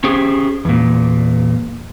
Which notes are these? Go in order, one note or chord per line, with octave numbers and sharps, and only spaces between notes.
C#4 G4 G#4 C5
E2 A#2